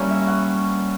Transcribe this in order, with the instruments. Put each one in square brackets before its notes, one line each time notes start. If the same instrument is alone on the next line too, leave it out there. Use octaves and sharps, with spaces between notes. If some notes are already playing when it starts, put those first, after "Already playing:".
Already playing: [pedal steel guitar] G3 A#3 C#4 E4 [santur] B4 C#5
[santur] E5
F#5